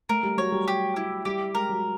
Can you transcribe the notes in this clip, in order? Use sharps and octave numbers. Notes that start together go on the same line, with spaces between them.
A3 A#4
G3
F#3 C#5
G3
G4
E4
G3 G4
G#3 A#4
F#3